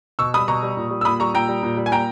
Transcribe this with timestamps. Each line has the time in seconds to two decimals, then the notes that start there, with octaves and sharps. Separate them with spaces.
0.19 B2 C#6 E6
0.34 G3 B5 D#6
0.48 B2 A#5 C#6
0.63 G3
0.77 A#2
0.91 G3
1.01 E6
1.05 A#2 B5 D#6
1.20 G3 A#5 C#6
1.34 A#2 G5 A#5
1.49 G3
1.63 A#2
1.77 G3
1.86 G#5
1.92 A#2 G5 A#5